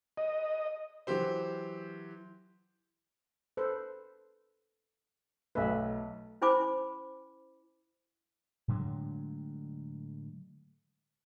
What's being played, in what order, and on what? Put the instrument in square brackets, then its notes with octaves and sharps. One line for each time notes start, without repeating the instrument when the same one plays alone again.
[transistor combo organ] D#5
[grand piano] E3 F#3 G4 C5
[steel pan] A4 B4 C5
[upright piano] B1 A3 [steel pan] B4 E5
[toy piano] C#4 E4 C5 G#5 B5 D6
[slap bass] A2 D3 F#3 G#3